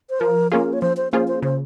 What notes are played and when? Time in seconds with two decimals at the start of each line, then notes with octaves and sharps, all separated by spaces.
0.10 C5
0.20 F3 A#4
0.52 A#3 C#4 F4 G#4 A#4
0.73 C#5
0.82 F3 C5
0.97 C5
1.12 A#3 C#4 F4 G#4 C5
1.28 C5
1.42 C#3 C5